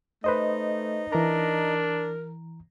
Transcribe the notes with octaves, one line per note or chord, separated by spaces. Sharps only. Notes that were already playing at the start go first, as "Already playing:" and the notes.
A3 D#4 B4 C5 D#5
E3 D4 A#4 A#5